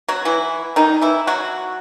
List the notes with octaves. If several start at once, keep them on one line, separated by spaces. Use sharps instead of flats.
F#3 F#4
E3 E4
D#3 D#4
E3 E4
F#3 F#4